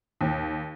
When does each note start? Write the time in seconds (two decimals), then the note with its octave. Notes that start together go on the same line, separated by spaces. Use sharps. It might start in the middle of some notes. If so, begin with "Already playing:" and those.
0.21 D#2